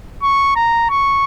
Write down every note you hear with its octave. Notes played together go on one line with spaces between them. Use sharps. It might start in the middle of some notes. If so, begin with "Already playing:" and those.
C#6
A#5
C#6